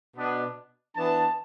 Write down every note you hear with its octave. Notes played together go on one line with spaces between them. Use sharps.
B2 B3 D4
E3 B3 D4 A5